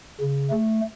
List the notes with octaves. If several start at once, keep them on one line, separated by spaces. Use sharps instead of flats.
C#3
A3